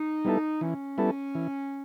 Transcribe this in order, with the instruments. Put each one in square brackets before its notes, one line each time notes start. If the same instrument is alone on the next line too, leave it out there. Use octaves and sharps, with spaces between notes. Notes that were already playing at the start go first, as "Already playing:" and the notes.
Already playing: [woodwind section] D#4
[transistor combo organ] G3 B3 E4 A4
[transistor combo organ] E3 [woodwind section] C#4
[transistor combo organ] G3 B3 E4 A4
E3